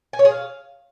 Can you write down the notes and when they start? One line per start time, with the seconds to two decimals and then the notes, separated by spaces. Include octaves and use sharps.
0.13 G#5
0.19 C#5
0.25 G#4
0.31 F5